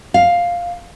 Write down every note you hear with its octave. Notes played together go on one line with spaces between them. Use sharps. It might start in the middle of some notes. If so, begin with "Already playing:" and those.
F5